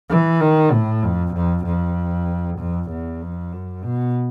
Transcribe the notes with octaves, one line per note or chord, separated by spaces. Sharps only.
E3
D#3
A2
F2
F2
F2
F2
E2
F2
F#2
B2